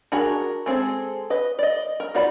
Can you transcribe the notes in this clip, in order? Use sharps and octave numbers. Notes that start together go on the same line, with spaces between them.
D4 F#4 G#4 A#4
G#3 C4 G#4 A4
B4 D#5
D5 D#5
A#4
D#4 F4 F#4 D5 B5